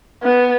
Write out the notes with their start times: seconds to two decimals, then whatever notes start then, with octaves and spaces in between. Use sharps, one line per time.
0.23 B3